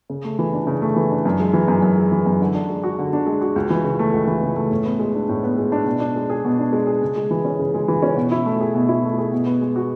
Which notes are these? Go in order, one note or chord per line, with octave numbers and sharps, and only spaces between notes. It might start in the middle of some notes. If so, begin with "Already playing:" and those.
C#3
A3
E3
D4
C#3
A3
E3
D4
F#2
G#3
E3
F#2
F#2
G#3
E3
F#2
D3
D4
G#3
F#4
D3
D4
G#3
F#4
C#2
E3
C#3
A3
C#2
E3
C#3
A3
A2
B3
G#3
D4
A2
B3
G#3
D4
B2
D4
G#3
G#4
B2
D4
G#3
G#4
C#3
G#3
E3
C#4
C#3
G#3
E3
C#4
B2
E4
A3
G#4
B2
E4
A3
G#4
B2
B3
G#3
F#4